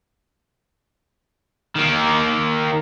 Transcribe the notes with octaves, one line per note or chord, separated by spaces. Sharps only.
D#3 A#3